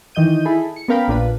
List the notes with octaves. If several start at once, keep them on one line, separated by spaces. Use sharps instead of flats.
D#3 E3 D#5 G6 D#7
E4 G#4 A4 B5
C#7
B3 C#4 A#4 F5 G5 B5
A#1 A#2 D4 F4 B4 B5